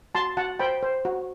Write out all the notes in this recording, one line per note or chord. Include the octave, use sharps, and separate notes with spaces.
F#4 A5 C6
F#4 F#5 A5
C5 G5 B5
C5
F#4